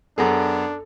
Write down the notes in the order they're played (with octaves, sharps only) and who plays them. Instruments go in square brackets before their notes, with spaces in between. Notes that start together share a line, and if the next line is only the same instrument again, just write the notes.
[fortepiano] F#2 B3 G#4 [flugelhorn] D4 [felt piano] A4